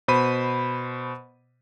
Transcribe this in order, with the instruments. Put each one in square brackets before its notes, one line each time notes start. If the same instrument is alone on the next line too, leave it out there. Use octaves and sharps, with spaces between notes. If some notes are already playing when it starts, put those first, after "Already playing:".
[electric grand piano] B2 C5 B5 D#7